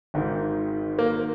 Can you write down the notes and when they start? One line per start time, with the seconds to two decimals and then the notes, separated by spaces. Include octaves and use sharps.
0.14 G#1 G#2 D#3
0.99 A#3